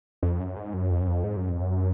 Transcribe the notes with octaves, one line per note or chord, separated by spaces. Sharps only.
F2
F#2
G#2
F#2
F2
F#2
F2
G#2
F#2
F2
F#2